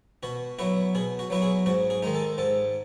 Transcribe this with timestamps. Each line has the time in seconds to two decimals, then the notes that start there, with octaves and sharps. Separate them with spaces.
0.23 B2 F#4
0.59 F#3 B3 E4 F#4
0.95 B2 G#4
1.19 F#4
1.30 F#3 B3 E4 F#4
1.42 G#4
1.66 G#2 F#4
1.90 G#4
2.03 D#3 G#3 D#4
2.15 A4
2.38 G#2 A4